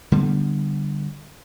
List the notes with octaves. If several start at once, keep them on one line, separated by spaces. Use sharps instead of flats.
D3 G3 B3